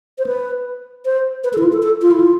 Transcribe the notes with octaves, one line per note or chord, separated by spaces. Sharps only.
C5
B4
C5
B4
A4
E4
F4
A4
A4
F4
E4
F4